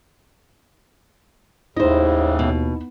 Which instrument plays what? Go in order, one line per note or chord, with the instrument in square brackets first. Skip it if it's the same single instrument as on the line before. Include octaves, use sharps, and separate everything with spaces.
[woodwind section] D#2 [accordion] A2 C#3 E3 [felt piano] D#4 E4 [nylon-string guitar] C5 D#5
[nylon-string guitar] B2